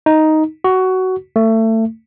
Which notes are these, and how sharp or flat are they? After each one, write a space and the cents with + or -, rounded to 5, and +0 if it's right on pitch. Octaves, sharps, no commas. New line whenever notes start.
D#4 +5
F#4 +15
A3 +25